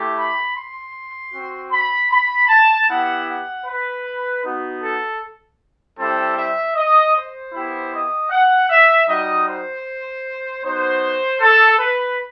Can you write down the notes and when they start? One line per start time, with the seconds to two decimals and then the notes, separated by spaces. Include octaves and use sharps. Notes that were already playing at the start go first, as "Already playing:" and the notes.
Already playing: A3 E4 G4
0.17 B5
0.56 C6
1.34 C4 F#4
1.71 B5
2.11 B5
2.49 A5
2.88 B3 E4 G4 F#5
3.27 F#5
3.66 B4
4.44 B3 D#4 F#4
4.82 A4
5.97 G3 C4 E4 G4 A4
6.36 E5
6.75 D#5
7.14 C5
7.53 B3 E4 G4
7.92 D#5
8.30 F#5
8.70 E5
9.07 G3 D#4 F#4 D#5
9.47 C5
10.63 B3 D#4 F#4 C5
11.41 A4
11.79 B4